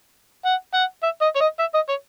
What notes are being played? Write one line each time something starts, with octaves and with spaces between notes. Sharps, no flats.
F#5
F#5
E5
D#5
C#5
D#5
E5
D#5
C#5